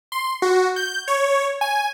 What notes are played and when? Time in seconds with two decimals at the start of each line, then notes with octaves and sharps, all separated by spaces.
0.12 C6
0.42 F#4
0.76 G6
1.08 C#5
1.61 G#5